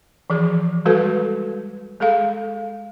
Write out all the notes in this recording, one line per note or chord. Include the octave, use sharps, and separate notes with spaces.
E3 F3 G#4
G3 G#3 F#4 A4 B4
G#3 G#4 A4 F5